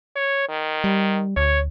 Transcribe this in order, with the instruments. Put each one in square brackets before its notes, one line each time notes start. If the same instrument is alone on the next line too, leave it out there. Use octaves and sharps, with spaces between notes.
[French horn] C#5
D#3
[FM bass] G3
[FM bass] D2 [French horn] C#5